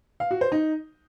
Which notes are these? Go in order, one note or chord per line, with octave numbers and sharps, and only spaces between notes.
F5
F#4
C5
D#4